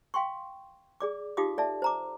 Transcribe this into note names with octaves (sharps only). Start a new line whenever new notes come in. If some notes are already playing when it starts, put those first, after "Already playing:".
F5 G5 C6 C#6
G#4 D5 D6
D#4 F4 G4 F5 D6 D#6
A4 D5 E5 A5
C5 A#5 D6